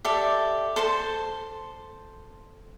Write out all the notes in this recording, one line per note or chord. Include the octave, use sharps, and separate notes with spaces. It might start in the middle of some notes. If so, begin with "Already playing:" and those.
G4 A4 D5 E5
A4 C5 A5 C6